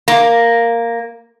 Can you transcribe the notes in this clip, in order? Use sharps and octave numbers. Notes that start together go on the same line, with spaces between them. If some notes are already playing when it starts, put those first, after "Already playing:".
A#3